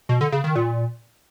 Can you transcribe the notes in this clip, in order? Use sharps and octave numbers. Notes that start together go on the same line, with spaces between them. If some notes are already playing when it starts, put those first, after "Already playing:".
B2
D3
C#3
D#3
A#2